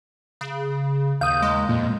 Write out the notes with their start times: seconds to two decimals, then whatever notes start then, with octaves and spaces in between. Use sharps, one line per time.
0.41 C#3
1.21 D#2 F5 D#6 G6
1.42 G#3
1.69 F2 A#2